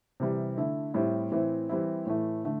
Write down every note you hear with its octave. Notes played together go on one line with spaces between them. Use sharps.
C3 E3 G3
D3 A3 E4
A2 G3 C4 E4
A2 E3 C4 E4
E3 G3 C4 E4
A2 E3 A3
D3 A3